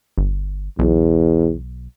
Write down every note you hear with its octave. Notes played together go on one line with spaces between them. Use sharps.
G1
B1 E2